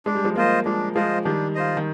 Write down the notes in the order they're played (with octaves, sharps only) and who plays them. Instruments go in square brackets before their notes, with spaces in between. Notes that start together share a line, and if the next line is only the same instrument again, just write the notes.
[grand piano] G#3 [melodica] D4
[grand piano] G3
F3 G#3
[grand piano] G3 A#3 [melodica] F4 C5 D#5
[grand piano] F3 G#3 [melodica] D4
[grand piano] F3 G#3 [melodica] F4 C5 D#5
[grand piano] D#3 G3 [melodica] D4
[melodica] F4 C5 D#5
[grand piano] D#3